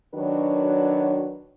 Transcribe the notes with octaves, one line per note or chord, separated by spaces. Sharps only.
D#3 F#3 D4 F#4 B4 C#5